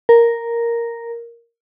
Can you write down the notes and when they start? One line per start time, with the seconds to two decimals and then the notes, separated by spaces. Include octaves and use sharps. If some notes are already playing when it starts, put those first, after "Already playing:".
0.09 A#4